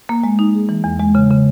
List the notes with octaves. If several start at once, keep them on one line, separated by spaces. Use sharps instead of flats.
A#3
G#3
D#4
G#4
E3
E2
G#3
C#3
C#3